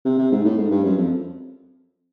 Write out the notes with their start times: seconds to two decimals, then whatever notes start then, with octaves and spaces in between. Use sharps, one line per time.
0.05 C3
0.18 C3
0.32 G#2
0.45 A2
0.58 G#2
0.70 G2
0.84 F#2
0.97 F2